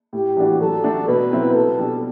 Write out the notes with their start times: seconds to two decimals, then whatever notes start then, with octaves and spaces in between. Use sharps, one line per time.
0.13 A2 G4
0.37 E3 G3 D4 F#4
0.60 F#3 A4
0.84 A3 D4 F#4
1.08 B2 B4
1.31 F#3 C4 E4
1.55 B2 A4
1.79 G3 D4